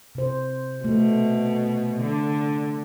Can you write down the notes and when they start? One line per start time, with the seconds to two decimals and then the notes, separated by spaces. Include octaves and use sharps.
0.15 C3 C5
0.85 B2 A3
2.01 D3